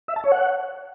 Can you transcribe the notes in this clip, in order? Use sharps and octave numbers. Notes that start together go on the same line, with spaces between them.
E5
A5
C#5
F#5